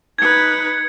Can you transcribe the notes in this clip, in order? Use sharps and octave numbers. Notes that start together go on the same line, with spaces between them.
D#4 B4 G#6 C#7